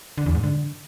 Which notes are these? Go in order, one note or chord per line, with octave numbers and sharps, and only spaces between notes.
D3
E2
G#2
D3